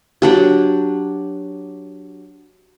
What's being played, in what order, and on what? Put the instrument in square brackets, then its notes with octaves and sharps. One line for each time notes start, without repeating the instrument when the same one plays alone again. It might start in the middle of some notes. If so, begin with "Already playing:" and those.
[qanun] F#3 D4 G4